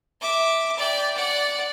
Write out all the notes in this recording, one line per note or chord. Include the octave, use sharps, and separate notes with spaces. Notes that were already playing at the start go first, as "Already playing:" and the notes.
E5 D6
D5 G5
D5 F#5